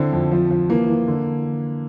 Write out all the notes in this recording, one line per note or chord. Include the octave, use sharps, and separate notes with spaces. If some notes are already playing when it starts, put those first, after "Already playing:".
Already playing: D3 C4 E4
F2
F3
F3
E3 A#3
E3
D3